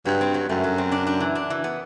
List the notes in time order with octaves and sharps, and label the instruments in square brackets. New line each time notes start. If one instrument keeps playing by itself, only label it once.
[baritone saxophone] G2 [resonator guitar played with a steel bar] F#3
[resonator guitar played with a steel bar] C4
F#3
[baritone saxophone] F#2 [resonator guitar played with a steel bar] A3
[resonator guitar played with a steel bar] F#3
C4
D4
D4
E3
D4
E3
B3